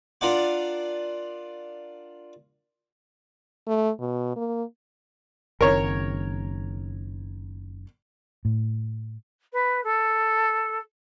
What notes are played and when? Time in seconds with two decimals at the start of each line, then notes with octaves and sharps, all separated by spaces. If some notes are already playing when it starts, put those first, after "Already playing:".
0.21 D4 F4 A#4 D5 F#5 D6
3.67 A3
4.00 B2
4.36 A#3
5.61 F#1 D#3 C4 A#4 C#5
8.45 A2
9.52 B4
9.83 A4